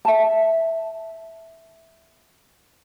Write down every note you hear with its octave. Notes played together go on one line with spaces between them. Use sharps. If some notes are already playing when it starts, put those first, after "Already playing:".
E5 A5